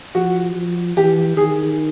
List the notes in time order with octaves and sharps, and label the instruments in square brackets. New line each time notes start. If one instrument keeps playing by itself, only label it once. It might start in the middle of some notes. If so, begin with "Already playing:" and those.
[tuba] F3 [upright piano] F#4
[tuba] F3
[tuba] E3 [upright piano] G4
[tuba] D#3 [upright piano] G#4